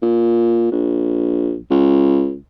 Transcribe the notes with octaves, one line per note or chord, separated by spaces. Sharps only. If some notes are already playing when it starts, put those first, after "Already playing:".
A#2
A#1
C#2